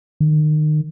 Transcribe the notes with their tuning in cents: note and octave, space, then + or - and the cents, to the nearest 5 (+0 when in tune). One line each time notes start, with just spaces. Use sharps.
D#3 -30